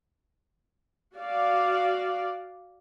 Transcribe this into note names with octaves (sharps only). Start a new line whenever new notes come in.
F#4 D5 F5